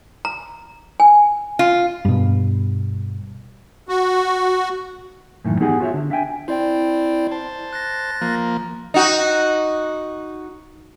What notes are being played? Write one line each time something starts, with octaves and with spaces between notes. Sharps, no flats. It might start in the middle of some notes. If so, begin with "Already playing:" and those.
A#5
G#5
F4
G2 B2
F#4
F#2 A2 D#3 E3
B3 D#4 G4 G#4 F#5 G#5
F4 F#4 C5 C#5 E5
D3
D4 E5 F5 G5 G#5
C4 E4 D5 G5
C5 A5
F#6 A6 A#6
F3 A#3
D#4 F#4